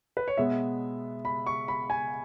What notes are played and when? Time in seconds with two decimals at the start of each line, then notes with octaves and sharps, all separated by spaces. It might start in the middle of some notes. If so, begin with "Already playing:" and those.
0.17 B4
0.28 C#5
0.37 B2 G#3 B3 E5
1.25 B5
1.47 C#6
1.68 B5
1.90 G#5